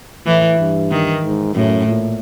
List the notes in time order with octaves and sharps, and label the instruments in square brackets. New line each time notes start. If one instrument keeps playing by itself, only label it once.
[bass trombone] A2 [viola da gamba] E3
[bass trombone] G2
[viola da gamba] D#3
[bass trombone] G#2
[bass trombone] F#2 [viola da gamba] A2
[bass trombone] A#2